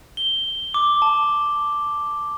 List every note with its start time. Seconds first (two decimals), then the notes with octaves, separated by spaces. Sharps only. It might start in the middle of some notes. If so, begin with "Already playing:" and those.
0.17 G7
0.74 D6
1.02 A5